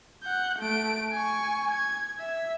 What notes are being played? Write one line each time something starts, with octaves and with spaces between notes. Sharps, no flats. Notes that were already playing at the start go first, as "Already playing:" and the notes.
F#5 G6
A3 D7
G#5 C#6
G#6
E5